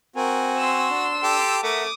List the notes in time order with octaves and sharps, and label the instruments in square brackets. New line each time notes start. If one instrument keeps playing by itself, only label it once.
[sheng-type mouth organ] C4 G#5 [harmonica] F#4 [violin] A#4
[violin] C6 E6
[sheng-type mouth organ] D4
[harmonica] G4 A4
[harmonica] A3 [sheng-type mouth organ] A#4 E5 F#5 [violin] D6 D#6